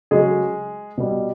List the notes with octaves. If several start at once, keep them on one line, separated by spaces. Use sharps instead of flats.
C#3 F#3 G#3 A3 G#4
B2 G3